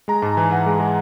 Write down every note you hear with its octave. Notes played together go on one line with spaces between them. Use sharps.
G#3 A#5
G#2 A5
E3 G#5
E3 F#5
G#3
G#3